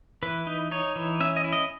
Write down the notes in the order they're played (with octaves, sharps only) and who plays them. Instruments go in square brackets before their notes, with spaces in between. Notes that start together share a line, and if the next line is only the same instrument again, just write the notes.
[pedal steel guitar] E3 B4
D#4
D#4 C#5
E3
C#4 E5
D#5
E4
D#5